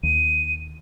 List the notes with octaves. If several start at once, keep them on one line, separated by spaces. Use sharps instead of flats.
D#2 D#7